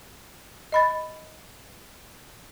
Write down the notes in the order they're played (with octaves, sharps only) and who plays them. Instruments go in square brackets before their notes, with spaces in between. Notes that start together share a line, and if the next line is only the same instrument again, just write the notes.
[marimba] D#5 B5 A6